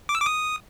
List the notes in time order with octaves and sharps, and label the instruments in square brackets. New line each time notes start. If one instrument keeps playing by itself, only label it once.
[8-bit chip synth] D6
E6
D6
D#6